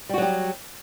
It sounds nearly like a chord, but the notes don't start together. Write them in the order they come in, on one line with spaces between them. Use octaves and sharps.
G3 F#4 F#3 G4